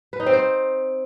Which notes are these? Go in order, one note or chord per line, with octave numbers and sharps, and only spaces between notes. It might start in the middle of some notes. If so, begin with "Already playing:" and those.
B4
D#4
C4
C5